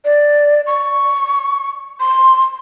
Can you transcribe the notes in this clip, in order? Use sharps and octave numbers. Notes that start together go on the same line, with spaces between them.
D5
C#6
C6